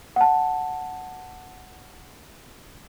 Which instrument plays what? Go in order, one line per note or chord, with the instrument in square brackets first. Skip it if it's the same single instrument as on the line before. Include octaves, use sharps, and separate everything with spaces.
[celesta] F#5 A5